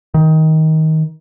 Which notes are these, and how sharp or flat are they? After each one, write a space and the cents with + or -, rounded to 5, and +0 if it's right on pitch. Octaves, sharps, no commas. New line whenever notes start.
D#3 +20